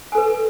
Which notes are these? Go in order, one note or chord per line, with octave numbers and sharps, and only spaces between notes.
A4 B4 G#5